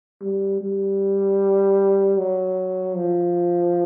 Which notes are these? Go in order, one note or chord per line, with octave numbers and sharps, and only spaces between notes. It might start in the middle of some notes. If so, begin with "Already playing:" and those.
G3
G3
F#3
F3